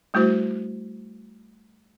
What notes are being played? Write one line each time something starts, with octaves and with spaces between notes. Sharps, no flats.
G3 A3 E4 F#4 C5